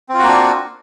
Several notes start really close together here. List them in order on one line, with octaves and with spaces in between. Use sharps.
C4 F4 F#4 A#3 D4